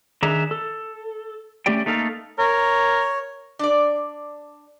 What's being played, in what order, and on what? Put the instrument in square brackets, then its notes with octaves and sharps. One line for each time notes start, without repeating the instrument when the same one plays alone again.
[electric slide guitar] D#3 D4 G#4 E5 A#5
A4
A3 C#4 G4 D5 G5
A3 A#3 D#4 A4 F5
[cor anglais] A#4 [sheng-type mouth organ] C#5
[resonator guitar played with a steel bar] D4 D5